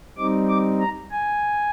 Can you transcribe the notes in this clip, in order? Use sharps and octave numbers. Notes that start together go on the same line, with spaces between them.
G3 C4 D#4 D6
D6
A#5
G#5